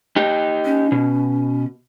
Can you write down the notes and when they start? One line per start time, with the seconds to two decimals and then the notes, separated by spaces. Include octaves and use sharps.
0.16 D#4 G4
0.65 C#4
0.92 B2